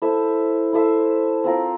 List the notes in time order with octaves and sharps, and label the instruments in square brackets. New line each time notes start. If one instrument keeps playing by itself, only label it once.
[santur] E4 A4 C5 E5
E4 A4 C5 E5
C4 F4 A#4